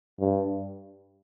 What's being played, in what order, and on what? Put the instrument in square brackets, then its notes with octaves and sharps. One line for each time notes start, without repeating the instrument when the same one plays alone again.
[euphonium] G2